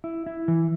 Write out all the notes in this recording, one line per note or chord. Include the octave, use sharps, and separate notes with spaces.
E4
E4
E3